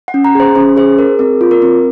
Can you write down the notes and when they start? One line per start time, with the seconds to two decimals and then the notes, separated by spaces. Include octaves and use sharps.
0.08 F#5
0.14 C#4
0.25 A#5
0.35 G#4 C5
0.55 C#4 C5
0.76 G#4 C5
0.98 G#4 A#4
1.19 C4 A#4
1.41 F4
1.51 A#4
1.62 C4